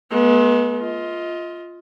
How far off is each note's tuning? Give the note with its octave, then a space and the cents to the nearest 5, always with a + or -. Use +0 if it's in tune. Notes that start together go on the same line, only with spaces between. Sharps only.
G#3 +40 B3 -30
F4 +0 D#5 +30